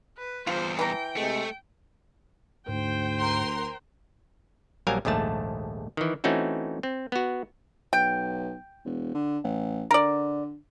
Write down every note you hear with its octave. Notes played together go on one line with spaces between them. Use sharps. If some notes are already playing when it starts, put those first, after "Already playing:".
B4
E2 G2 F4 C5
E3 G5 A#5
C3 G#3 A3
D2 G#2 C5 G5
A#4 C6
A#1 F#3 G3 A#4 F5 G#5
A#1 D#2 G#2 A3 A5
D#3 E3
E3 A3 C4 C#4 D#4 F#4
C4
B3 F#4
B1 G5
E1
D3
A1
D3 A#4 D5